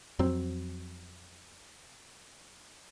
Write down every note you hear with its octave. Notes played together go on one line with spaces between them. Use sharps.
F2 F#3 C4